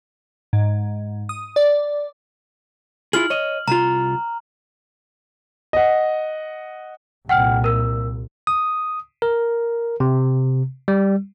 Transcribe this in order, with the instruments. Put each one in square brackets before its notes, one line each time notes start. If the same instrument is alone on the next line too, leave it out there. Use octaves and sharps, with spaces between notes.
[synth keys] G#2
D#6
D5
[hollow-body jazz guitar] E4 F4 G#4 [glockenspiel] F6 F#7
[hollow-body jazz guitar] C#5 D#5
[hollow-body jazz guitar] C2 F4 [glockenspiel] A#5
[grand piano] D#5 F#5
[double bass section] C2 A#2 [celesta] F#5 G5 F6
[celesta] A#4 E6
[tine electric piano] D#6
A#4
C3
G3